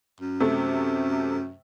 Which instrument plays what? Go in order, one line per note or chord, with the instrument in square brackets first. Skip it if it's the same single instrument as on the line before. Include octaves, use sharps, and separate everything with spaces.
[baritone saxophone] F#2
[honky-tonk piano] C3 A3